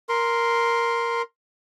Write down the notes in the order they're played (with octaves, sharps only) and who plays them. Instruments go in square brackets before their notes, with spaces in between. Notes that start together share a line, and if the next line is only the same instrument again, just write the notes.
[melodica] A#4 C6